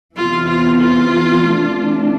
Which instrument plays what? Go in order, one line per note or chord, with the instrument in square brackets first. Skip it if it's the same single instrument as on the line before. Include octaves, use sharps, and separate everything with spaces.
[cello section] E2 C3 E3 B3 [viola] F4
[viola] F4
F4
[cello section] C3 E3 A3 D4